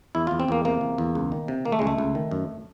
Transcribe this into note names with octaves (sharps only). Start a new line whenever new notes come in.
E2 E4
E2 F4
C4
E2 A#3
C3 A#3
E2
E2
C#2
D#3
C3
D#3 A#3
A3
G#3
C#2
A3
C#2
D#3
F#2